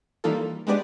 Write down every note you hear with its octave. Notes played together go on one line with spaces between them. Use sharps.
E3 G3 A#3 D#4 F4 A4
G#3 B3 D4 G4 B4 D5